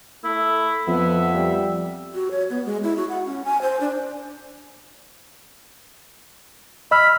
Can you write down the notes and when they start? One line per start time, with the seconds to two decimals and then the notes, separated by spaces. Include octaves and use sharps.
0.24 A3 E4
0.88 F2 B3 E5
1.34 G3
2.14 F#4
2.31 C#5
2.50 B3
2.66 G#3
2.83 E4
2.97 F#4
3.10 F#5
3.25 C#4
3.44 G#5
3.62 C5
3.81 D4
6.91 D#5 B5 E6 F6